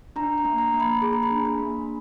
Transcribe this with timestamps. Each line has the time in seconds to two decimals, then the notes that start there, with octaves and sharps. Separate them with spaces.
0.16 D4 A#5
0.38 A#5
0.45 A#3
0.58 A#5
0.74 A#3
0.80 B5
1.02 G#4 B5
1.13 A#5
1.23 B5
1.31 D4
1.45 B5
1.59 A#3